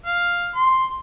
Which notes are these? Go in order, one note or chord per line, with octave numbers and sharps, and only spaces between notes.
F5
C6